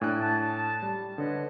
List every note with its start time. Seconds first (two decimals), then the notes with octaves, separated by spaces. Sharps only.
0.01 A2 D4 D5 G#5 F#6
0.20 A5
0.82 G3
1.18 D3 B4 C#5 D#5